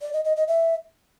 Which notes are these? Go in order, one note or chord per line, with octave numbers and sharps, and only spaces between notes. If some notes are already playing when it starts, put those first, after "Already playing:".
D5
D#5
D#5
D#5
E5